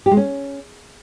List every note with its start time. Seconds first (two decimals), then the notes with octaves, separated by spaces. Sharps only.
0.06 G4
0.11 G#3
0.17 C#4